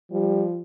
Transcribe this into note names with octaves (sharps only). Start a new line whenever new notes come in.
F3 G3